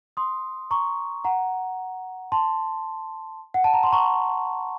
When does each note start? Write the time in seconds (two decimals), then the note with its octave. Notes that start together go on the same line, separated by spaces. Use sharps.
0.17 C6 D#6
0.71 A#5 C#6
1.24 F#5 A#5
2.32 A5 C6
3.54 F#5
3.64 A5
3.74 A#5
3.83 C6
3.92 A#5 C#6